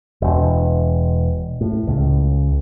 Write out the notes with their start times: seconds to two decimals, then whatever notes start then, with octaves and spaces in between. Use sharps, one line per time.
0.22 E1
1.61 A2
1.87 C#2